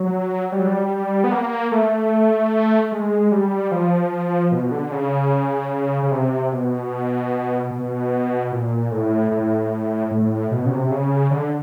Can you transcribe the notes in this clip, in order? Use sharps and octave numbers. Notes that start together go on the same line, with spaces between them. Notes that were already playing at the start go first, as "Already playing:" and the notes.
Already playing: F#3
G3
F#3
G3
B3
A#3
A3
G#3
G3
F3
B2
D3
C#3
C#3
C3
B2
B2
A#2
A2
A2
A2
B2
C#3
C3
C#3
D3